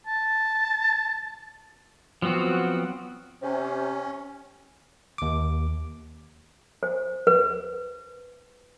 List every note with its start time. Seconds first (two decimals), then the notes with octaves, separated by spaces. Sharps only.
0.07 A5
2.22 F3 F#3 B3 C4 F#4
3.42 C3 C#4
5.18 D#2 D6
6.83 C5
7.27 B4